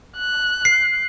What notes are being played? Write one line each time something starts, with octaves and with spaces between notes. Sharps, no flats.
F#6
C7